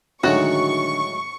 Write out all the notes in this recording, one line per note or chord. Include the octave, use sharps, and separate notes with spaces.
A2 D3 D#3 F#3 G#3 F#4 C#6